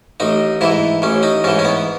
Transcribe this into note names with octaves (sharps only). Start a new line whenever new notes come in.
A1 D#4
G#2 E3 E4
A1 C#4
D#4
G#2 E3 C#4
C#4
B3